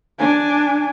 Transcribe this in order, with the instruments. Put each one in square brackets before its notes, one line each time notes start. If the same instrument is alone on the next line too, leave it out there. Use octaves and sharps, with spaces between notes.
[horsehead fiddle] D4 G#5